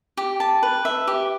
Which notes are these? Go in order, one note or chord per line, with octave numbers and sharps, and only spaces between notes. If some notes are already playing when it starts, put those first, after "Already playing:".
G4
A5
B4
E5
G4